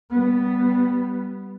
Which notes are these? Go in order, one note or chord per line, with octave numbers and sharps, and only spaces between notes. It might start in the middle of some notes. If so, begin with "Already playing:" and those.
G3 B3